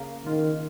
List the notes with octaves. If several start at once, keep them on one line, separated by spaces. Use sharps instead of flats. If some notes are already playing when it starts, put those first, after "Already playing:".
Already playing: C#3 A#3 C#4
D#3 F4